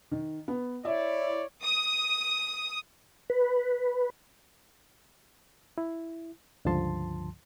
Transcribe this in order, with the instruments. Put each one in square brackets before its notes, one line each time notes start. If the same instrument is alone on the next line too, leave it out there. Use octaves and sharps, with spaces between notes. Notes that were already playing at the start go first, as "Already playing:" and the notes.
[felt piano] D#3
B3
[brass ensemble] E4 C#5 D5 [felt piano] E5
[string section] D#6
[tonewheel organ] B4
[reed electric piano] E4
C#2 G2 D3 F3 A5 C6